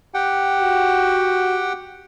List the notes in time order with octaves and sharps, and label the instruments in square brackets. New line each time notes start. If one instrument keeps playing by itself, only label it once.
[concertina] G4 F#5 G5
[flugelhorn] F#4